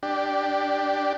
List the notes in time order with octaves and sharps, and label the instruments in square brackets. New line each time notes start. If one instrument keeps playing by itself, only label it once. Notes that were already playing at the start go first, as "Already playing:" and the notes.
[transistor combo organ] D4 G4